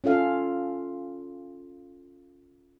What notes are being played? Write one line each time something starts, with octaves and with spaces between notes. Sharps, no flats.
C#4 F4 A4 F5